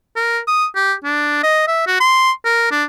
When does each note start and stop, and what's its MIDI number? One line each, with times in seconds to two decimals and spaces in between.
0.16 0.39 70
0.47 0.66 87
0.75 0.93 67
1.04 1.40 62
1.43 1.63 75
1.67 1.86 76
1.87 1.97 66
2.00 2.31 84
2.45 2.66 70
2.71 2.84 62